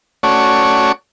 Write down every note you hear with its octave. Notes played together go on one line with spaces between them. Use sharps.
A3 C#4 F#4 C#5 D5